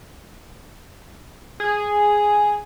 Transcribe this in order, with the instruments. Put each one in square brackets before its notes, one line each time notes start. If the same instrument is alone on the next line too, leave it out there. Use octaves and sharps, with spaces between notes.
[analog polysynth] G#4